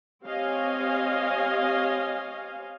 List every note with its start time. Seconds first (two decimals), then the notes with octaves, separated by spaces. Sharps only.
0.24 C4 G4 C#5 D#5 F5 G#5